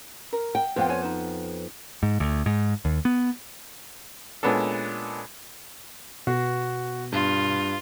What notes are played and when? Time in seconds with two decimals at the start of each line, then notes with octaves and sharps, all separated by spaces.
0.33 A#4
0.55 G5
0.76 F2 B3 C5 F5 G5
0.89 C5 C#5 G#5
1.03 D#4 C5
2.03 G#2
2.20 D2
2.46 G#2
2.85 D#2
3.05 B3
4.43 A#2 G#3 B3 C#4 D4 A4
6.27 B2 F#4
7.12 G2 F4